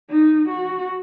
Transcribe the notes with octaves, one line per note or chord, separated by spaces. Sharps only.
D#4
F#4